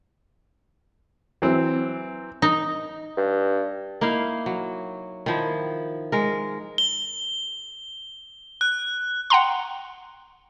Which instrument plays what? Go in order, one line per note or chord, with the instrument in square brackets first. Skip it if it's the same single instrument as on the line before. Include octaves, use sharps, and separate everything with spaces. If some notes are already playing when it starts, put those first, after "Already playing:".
[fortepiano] E3 F#3 C4
[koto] D#4
[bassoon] G2
[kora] A#3 D#4 E4 F5
F#3
D#3 F3 E4
G#3 A#4
[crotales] G7
F#6
[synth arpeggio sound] F#5 G5 A#5 C6